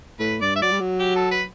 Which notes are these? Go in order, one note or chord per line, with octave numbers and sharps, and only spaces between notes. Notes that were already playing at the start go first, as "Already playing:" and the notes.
A2 B4
G2 D5
E5
F#3 D5
G3
F#3
G4
A4
B4